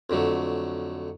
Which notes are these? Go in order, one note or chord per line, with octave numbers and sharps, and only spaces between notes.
F2 D3 F#3 A3